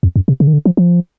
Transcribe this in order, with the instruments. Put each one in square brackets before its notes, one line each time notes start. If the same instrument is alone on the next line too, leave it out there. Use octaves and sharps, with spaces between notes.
[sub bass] F2
F#2
C3
C#3
D#3
D3
F3
F3